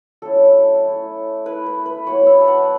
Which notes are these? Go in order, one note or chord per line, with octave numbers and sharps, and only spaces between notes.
F#3 A3 C#4 E4 A4
A3 E4
A3 E4 B4
B4
B4
F#3 B3 E4 C#5
E5
A5
F#5